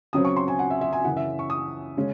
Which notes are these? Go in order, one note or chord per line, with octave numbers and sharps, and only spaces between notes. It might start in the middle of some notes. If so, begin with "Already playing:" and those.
C#2 C#3 F#3 C4 D#6
C#6
C6
G#5
F#5
E5
E5
G#5
F#2 C#3 E3 F#5
E5
C#6
D#6
C#3 G#3 C#4